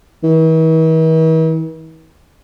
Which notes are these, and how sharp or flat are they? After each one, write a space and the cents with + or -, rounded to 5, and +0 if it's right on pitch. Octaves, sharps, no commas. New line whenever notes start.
E3 -45